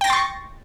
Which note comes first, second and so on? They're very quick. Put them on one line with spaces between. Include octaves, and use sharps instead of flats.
G5 A#6 A6 C6 C#6